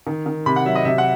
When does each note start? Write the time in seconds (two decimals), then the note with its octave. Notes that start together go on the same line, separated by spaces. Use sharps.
0.07 D#3
0.26 D#3
0.46 C3 B5
0.56 F#5
0.65 F#3 E5
0.75 D#5
0.85 C3 E5
0.98 F#5